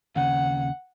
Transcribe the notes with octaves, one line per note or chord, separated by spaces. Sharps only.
D#2 C#3 F#5